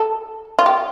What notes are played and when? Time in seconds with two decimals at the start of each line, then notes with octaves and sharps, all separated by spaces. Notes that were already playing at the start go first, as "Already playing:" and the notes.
Already playing: A4
0.59 F4
0.66 G4